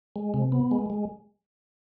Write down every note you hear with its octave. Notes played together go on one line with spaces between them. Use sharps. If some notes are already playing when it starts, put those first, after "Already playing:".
G#3
C3
B3
G#3
G#3